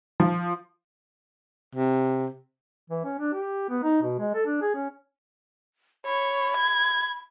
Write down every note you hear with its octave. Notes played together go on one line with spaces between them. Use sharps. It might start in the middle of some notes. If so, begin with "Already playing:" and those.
F3
C3
E3
C#4
D4
G4
B3
D#4
B2
G#3
A4
D4
G#4
C#4
C#5 B5
G#6